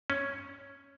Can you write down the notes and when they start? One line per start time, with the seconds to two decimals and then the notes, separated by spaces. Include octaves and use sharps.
0.10 C#4